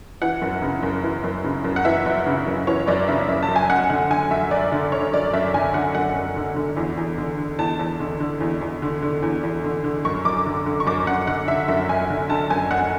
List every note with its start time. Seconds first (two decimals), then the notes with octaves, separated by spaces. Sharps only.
0.22 E3 F#5
0.42 F#2
0.62 C#3
0.83 F#2
1.03 E3
1.24 F#2
1.44 C#3
1.65 F#2
1.76 F#5
1.85 E3 E5
2.06 F#2
2.26 C#3
2.47 F#2
2.67 E3 C#5
2.87 F#2 D5
3.08 C#3 E5
3.28 F#2 E5
3.43 A5
3.49 F#2
3.56 G#5
3.70 F#2 F#5
3.90 D3 F#5
4.10 D3 G#5
4.31 F#2 E5
4.51 F#2 D5
4.72 D3
4.92 D3 C#5
5.13 F#2 D5
5.33 F#2 E5
5.54 D3 G#5
5.74 D3 F#5
5.95 F#2 F#5
6.15 F#2
6.36 D3
6.56 D3
6.77 E2
6.97 E2
7.18 D3
7.38 D3
7.59 E2 A5
7.79 E2
8.00 D3
8.20 D3
8.41 E2
8.61 E2
8.82 D3
9.02 D3
9.22 E2
9.43 E2
9.64 D3
9.84 D3
10.05 F#2 C#6
10.25 F#2 D6
10.46 D3
10.66 D3
10.80 C#6
10.87 F#2 D6
11.07 F#2 F#5
11.27 D3 F#5
11.48 D3 E5
11.68 F#2 E5
11.89 F#2 G#5
12.10 D3
12.30 D3 A5
12.50 F#2 G#5
12.71 F#2 F#5